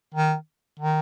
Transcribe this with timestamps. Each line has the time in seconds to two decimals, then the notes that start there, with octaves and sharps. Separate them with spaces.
0.15 D#3
0.80 D#3